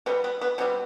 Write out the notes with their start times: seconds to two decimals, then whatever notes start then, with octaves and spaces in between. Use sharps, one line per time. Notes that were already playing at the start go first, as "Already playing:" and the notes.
0.06 B2 G3 B3 C4
0.24 B3
0.41 B3
0.58 B2 G3 B3 C4